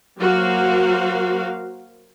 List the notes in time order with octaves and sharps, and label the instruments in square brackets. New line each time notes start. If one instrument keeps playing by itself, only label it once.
[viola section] F#3 A#3 F#4 A#4 C5 F5